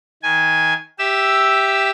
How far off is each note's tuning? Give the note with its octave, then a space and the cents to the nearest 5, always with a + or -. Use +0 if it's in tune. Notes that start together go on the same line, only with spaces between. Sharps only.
D#3 +25 G#5 +0
G4 +0 E5 +0 E6 +0